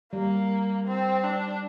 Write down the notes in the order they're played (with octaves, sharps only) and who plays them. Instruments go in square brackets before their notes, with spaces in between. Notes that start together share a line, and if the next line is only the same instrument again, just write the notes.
[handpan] G3 [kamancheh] A#3
[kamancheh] C4
D4